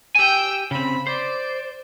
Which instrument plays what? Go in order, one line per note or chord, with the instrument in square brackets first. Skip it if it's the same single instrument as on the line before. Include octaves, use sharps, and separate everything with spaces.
[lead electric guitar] G4 G#5 [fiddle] G5 E6
[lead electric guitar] C#3 C4 [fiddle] B5
[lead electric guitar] C5 [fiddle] D5